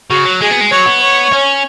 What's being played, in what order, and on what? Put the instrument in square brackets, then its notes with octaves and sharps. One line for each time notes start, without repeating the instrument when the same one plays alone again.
[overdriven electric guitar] C#3 [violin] F#4
[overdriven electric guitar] F#3
[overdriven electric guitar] G#3 [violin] G#4
[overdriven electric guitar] B3
G#3
[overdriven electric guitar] F#3 [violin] C#5
[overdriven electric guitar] B3
[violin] C#5
[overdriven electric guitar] C#4